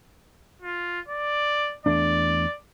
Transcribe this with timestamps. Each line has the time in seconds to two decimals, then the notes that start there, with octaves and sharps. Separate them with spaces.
0.62 F4
1.09 D5
1.86 E2 A3 D4 D5